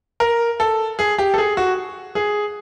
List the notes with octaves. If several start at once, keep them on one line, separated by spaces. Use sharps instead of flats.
A#4
A4
G#4
G4
A4
G#4
F#4
G#4